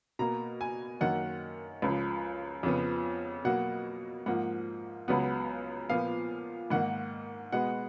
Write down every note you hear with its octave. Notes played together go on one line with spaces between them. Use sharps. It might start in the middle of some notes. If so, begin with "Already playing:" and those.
B2 A#3 A#5
G#5
F#2 D#3 A#3 F#5
C#2 C#3 F3
F2 C#3 F3 B3
B2 F#3 A#3 F#5
G#2 F3 A#3 F#5
C#2 C#3 F#3 B3 F#5
A#2 F3 B3 F5
G#2 D#3 A#3 F#5
B2 G#3 B3 F#5